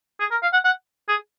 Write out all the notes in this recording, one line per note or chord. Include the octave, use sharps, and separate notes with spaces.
G#4
A#4
F5
F#5
F#5
G#4